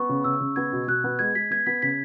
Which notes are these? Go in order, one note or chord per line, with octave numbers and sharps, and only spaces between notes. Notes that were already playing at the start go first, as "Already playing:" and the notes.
Already playing: B3 C#6
C#3
C#3 E6
C#3
B3 G#6
B2
B2 F#6
B3
G#3 G#6
G#3 B6
B3 G#6
B3 B6
C#3 B6